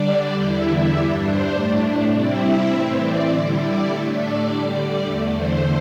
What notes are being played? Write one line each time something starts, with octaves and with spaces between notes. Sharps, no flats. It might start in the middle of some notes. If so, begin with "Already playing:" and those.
Already playing: D3 G3 D4 D5
E2 D3 G3 E4 G5
E5
G2 G3 D4 D5
C5
A2 A3 D4
C3 G3 C4 E4 D5
E5
A2 E3 C4
D5
D3 G3 E4 C5
D5
A2 A3 D4 E5
D5
D3 G3 D4 D5
D5
E2 D3 A3
C5